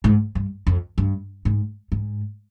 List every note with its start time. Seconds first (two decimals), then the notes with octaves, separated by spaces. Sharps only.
0.04 G#2
0.35 G2
0.67 F2
0.98 G2
1.45 G#2
1.92 G#2